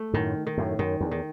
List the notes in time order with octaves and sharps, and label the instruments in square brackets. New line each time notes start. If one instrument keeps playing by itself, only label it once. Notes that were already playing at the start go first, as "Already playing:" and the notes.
Already playing: [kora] A3
[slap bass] F#2 A2 [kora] D#3
[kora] D#3
[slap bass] F#2 A2
[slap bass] F#2 [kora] D#3
[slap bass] E2
[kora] D#3